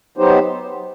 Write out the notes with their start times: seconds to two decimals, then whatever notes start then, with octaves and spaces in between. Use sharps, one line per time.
0.18 F#3 B3 D#4 G4 C5